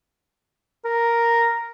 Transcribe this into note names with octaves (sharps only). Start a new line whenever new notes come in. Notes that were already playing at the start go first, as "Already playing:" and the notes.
A#4